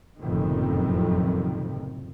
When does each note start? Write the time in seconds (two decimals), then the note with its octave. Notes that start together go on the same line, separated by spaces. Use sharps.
0.19 F#1 F2 A2 C3 D#3